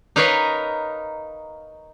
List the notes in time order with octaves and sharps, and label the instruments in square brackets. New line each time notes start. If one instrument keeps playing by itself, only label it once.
[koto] D#4 A#4 B4 C#5 D#5 F5